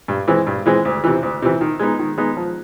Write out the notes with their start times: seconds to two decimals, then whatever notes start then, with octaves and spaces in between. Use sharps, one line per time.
0.08 G2
0.28 E3 G#3 C4
0.47 G2
0.66 E3 G#3 C4
0.85 D2
1.04 C3 E3
1.23 D2
1.42 C3 E3
1.61 D#3
1.79 G#3 B3 D#4
1.99 D#3
2.18 G#3 B3 D#4
2.37 F3